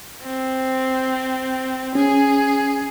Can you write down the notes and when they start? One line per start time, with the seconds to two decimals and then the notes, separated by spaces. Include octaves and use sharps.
0.22 C4
1.95 C#4 G#4